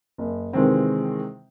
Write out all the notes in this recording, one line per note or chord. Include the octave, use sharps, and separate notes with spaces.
F#1
C3 D#3 E3 G#3 C4